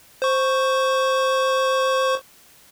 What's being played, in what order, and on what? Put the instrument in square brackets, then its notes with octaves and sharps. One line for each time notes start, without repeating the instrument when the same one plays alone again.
[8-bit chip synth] C5 C#6